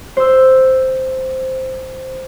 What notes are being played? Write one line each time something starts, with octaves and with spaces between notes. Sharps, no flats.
C5 E6